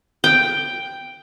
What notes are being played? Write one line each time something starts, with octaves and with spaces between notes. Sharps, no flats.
G5